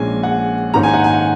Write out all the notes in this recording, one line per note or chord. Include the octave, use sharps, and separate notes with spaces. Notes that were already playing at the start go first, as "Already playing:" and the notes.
Already playing: A#1 A#2 G#3 C#4 G#5
F#5
G#2 D#3 A#3 C#4 A#5
G#5
F#5
G#5